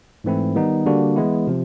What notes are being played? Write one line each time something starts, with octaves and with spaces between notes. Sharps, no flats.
G#2 E3 A3 C4 E4
D#3 G3 B3 D#4
D3 G3 A#3 D4 F#4
E3 G#3 B3 E4
C3 F3